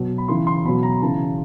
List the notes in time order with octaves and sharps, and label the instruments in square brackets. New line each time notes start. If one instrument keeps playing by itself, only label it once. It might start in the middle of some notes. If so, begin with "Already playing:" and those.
Already playing: [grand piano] B2 F#3
B5
C#3 E3 C6
C6
B2 F#3 B5
A#5
C#3 E3 A5